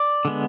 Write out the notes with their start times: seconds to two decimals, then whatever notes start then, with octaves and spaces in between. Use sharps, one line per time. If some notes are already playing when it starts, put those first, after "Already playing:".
Already playing: D5
0.25 D3 G#3 B3